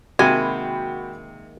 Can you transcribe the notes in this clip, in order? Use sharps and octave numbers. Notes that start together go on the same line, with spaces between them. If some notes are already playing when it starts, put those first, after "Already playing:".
C3 D#3 G#3 A#3 F#4 G5 G#5 B5